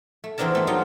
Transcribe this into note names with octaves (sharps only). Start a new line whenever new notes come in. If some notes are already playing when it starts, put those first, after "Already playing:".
A3
E2 E3 C4 D4 A#4 A5
A3 C4
F#3 G3 D#4 F4